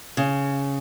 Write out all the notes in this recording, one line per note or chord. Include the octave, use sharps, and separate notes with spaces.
C#3